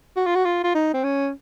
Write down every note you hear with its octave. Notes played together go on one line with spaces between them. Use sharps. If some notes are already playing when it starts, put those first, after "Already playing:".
F#4
F4
F#4
F4
F4
D#4
C4
C#4